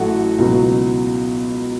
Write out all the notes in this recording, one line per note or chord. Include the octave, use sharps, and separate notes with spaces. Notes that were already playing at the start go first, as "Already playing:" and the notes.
Already playing: A1 F#3 A3 F#4 A4
C#2 B2 F#3